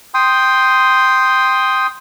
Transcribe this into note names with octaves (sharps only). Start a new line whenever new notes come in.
G5 C6 D#6